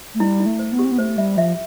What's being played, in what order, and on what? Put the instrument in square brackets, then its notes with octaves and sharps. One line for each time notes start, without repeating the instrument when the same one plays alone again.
[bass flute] A3
[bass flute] G3 [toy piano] E4
[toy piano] E4
[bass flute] A3
[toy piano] C5
[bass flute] B3
[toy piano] G4
[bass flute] C4
B3
[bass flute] A3 [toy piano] C5
[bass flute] G3 [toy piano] E5
[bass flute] F3 [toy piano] E5